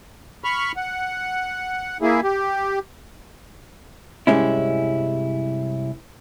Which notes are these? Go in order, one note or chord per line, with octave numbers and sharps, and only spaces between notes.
B5 C#6 F6
F#5
A#3 E4 G#4
G4
C2 G2 G3 G#3 C#4 E4